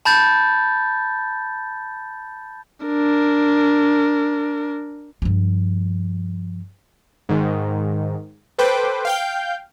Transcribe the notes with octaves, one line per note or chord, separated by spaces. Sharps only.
A5 B5 G6 A6
D4 A#4
G2 F3
G#2 D#3
A4 B4 C5 G5 D6
F5 G5 G6